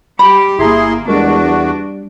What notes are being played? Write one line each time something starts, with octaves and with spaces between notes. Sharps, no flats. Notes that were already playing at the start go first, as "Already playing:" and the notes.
G3 G4 B5
G1 A#3 E4 G#4 A#5 C6
E2 G3 G#3 D4 F#4 A#4
G3